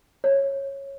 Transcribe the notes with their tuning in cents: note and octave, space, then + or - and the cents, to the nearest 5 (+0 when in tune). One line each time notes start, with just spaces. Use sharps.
C#5 -15